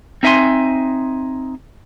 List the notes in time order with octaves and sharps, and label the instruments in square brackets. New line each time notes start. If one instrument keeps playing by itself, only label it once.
[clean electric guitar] C4 D#4 E5 G5 G#5 C6